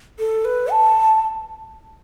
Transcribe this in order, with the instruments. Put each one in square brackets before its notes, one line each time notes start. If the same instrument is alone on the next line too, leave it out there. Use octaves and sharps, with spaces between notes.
[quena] A4
B4
A5